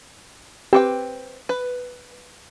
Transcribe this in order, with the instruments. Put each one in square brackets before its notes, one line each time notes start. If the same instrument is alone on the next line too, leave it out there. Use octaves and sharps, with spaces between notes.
[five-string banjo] C4 B4 G5 [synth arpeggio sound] G4 D6
[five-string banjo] B4